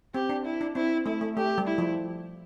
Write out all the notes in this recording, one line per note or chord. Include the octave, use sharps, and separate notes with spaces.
C4 G4
D4
E4
D4
C4 E4
A3 E4
A3
A3 G4
G3
E4
F3